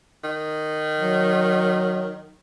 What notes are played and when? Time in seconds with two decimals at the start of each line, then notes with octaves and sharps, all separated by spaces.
0.24 D#3
0.99 F#3